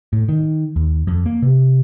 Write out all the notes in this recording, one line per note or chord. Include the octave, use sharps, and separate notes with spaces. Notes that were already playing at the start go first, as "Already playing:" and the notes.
A2
D#3
D#2
F2
A#3
C3